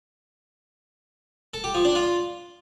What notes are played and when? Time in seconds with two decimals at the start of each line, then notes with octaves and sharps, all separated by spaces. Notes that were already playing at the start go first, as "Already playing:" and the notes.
1.54 A4
1.64 G4
1.74 F3
1.85 D4
1.95 F4